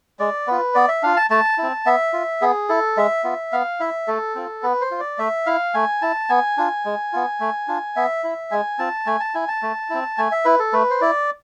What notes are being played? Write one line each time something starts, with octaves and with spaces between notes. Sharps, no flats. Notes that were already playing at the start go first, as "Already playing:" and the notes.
G#3 D5
B3 F4 B4
B3 D5
E5
D4 F4 F5
A5
A3 A5
C4 E4
B3 E5
F4
B3 G#4
E4 A4
G#3 E5
B3 F4
B3 F5
E4 E5
A3 A4
C4 F4
B3 B4
C5
F4
D5
A3 E5
E4 F5
A3 G#5
E4 A5
B3 G#5
D4 F4
G#3
B3 F4
A3
D4 F4
B3 E5
E4
G#3 G#5
C4 F4 A5
A3 G#5
A5
E4 G#5
A5
A3
C4 E4
A3 G#5
E5
E4 B4
A4
A3 B4
C5
E4 D5